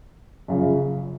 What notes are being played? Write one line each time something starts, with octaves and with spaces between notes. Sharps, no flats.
F#2 C#3 F3